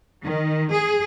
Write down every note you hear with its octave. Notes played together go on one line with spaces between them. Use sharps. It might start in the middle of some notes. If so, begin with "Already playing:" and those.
D#3
G#4